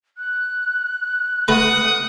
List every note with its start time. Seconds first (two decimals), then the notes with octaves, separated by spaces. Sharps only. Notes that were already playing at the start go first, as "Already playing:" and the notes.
0.18 F#6
1.48 A3 B4 F#5 A#5 D#6